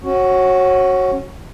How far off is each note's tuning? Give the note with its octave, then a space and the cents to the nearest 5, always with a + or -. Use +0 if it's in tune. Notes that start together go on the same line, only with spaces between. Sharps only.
C#4 -25 F#4 +5